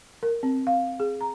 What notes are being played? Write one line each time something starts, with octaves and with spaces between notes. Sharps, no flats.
A#4
C4
F5
G#4
A#5